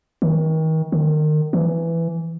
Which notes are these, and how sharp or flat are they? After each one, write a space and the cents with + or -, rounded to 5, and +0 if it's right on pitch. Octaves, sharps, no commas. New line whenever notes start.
D#3 +35
D#3 -30
E3 +10